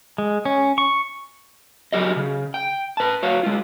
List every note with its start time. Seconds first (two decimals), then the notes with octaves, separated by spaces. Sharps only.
0.18 G#3
0.45 C#4
0.78 C#6
1.92 F#3 F#4 G4 D#5
2.16 C#3
2.54 G5
2.97 B4 A5
3.23 F#4 C#5 F5
3.43 G#3 F4